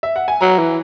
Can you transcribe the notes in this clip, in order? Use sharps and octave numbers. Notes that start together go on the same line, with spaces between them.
E5
F#5
G#5
F#3 A#5
E3